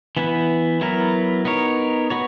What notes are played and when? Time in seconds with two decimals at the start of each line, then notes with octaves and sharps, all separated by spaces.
0.17 E3 B3 E4 B4
0.81 F#3 B3 E4 A#4
1.45 B3 D#4 A#4 C#5
2.10 B3 F#4 C#5